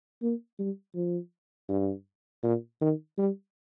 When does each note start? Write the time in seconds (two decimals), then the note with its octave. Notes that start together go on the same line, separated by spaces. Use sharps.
0.22 A#3
0.59 G3
0.95 F3
1.69 G2
2.43 A#2
2.81 D#3
3.18 G3